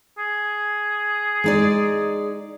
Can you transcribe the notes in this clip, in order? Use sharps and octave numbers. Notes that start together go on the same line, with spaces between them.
G#4
G#3 D#4 D5